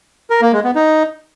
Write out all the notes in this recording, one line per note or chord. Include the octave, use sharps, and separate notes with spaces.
A#4
A#3
G#3
B3
D#4